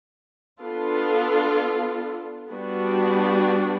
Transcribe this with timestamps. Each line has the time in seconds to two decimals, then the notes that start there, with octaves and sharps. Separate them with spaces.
0.61 B3 D4 F4 A4
2.50 G3 B3 D4 F#4